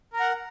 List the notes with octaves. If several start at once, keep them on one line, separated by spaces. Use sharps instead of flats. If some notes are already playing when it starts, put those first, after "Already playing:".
A#4 F#5 A#5